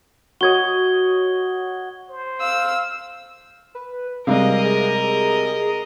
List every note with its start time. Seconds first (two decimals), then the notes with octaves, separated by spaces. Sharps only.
0.41 F#4 C#5 D#5 G#6 G7
2.09 C5
2.41 F5 E6
3.75 B4
4.27 C3 G3 G#3 A#4 D#5 F5
4.64 G#4